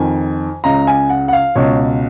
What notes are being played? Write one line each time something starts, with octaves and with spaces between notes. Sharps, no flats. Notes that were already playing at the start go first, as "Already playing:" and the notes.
Already playing: F2 D#3 G#5
C#2 C#3 A#5
G#5
F#5
F#5
F5
C#2 B2 C#5